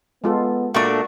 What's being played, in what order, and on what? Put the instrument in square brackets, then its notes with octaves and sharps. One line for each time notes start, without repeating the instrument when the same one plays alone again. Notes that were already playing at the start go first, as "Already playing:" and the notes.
[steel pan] G#3 F4 A4 [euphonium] B3
[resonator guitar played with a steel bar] A#2 A3 D4 [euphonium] A#3 [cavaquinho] F#4 C#6